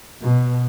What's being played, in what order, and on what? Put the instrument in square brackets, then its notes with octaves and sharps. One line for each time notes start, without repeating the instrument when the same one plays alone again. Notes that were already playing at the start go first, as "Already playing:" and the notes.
[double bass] B2